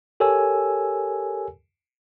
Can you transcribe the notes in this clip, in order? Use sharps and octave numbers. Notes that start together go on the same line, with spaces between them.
G4 A4 A#4 C#5 G#5 E6